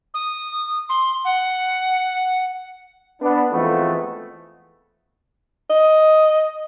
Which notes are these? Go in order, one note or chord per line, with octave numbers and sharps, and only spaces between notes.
D#6
C6
F#5
B3 D4
F2 E3 G#3 A3 B3
D#5